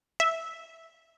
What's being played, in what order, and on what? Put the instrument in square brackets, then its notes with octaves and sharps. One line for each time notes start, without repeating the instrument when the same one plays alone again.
[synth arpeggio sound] E5